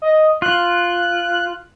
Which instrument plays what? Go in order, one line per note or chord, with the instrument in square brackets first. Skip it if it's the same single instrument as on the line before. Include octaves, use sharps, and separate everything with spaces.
[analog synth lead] D#5
[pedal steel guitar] F4 [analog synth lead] F#6